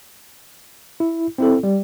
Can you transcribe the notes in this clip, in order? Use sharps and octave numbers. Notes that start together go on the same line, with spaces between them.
E4
C4 E4 A4
G3